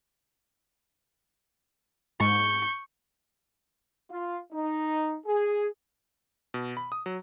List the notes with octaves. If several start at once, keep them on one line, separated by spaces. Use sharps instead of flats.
G#2 C#6 G6
F4
D#4
G#4
B2
B5
D#6
F#3